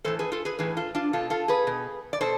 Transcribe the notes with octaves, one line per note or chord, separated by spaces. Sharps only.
A2 E3 A4 C5
G#4 B4
F4 A4
G#4 B4
A2 E3 G#4 B4
F4 A4
D4 F4
B2 F4 A4
F4 A4
G#4 B4
B2
D5
B2 A4 C5